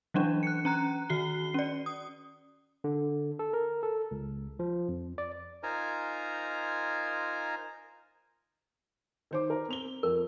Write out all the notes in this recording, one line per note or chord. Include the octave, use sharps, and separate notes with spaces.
E3 F#3 C#4 D4
F#6 C#7
C#4 A#5 F#6
D#3 F#4 C7 G7
C#4 D5
D#6
D3
A4
A#4
A4
C#2
F3
F2
D5
D#4 F4 A#4 C5 G#5 A#5
D#3 C5 D6
A#4
C4 F7 G7
F2 A#4